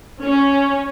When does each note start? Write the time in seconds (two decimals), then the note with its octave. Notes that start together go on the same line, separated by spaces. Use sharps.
0.21 C#4